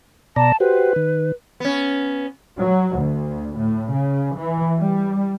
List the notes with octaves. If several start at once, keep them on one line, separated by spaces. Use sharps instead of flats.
B2 D5 A5 A#5
F#4 G4 B4 C5
D#3
B3 C#4
F#3
D2
A2
C#3
E3
G3